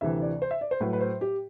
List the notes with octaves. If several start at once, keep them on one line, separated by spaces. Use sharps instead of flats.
D2 C3 E3 E5
D5
C5
E5
D5
C5
A2 F#3 B4
B4
C5
G4